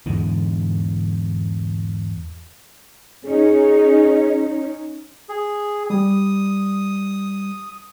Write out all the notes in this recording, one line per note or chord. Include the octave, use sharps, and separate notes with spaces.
E2 G#2 D3
C#4 D#4 G#4
G#4
G3 D#6